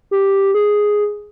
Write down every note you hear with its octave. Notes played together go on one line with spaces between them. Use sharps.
G4
G#4